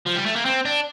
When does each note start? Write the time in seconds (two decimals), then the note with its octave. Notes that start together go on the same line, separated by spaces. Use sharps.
0.06 F3
0.15 G3
0.26 A3
0.36 A#3
0.45 C4
0.65 D4